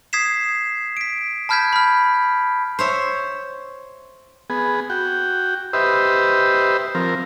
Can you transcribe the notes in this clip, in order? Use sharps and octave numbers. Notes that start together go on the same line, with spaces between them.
D#6 G#6 B6 C7 E7
B6 D7
A5 B5 F6 G6 G#6 B6
B5 F6
C5 C#5 E5
B3 G#4
F#4 G5
G4 B4 C5 D#5 E5
F3 C4 A#4